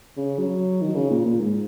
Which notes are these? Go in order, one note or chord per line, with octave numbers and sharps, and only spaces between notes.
C#3
F#3
D#3
C#3
A#2
A#2
G#2